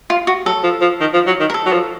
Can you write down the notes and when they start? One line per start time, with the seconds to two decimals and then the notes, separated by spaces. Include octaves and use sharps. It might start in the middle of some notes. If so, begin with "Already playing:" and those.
0.10 F4
0.27 F#4
0.46 F#3 A4
0.64 F3
0.81 F3
1.00 D#3
1.14 F3
1.27 F#3
1.40 D#3
1.50 A#4
1.54 A4
1.66 F#3
1.72 F3